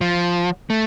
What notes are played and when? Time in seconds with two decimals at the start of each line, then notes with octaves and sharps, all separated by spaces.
0.01 F3
0.70 A3